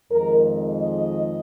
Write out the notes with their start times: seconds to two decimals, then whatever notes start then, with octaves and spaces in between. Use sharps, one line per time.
0.11 F2 D#3 G#3 A#4
0.81 D#5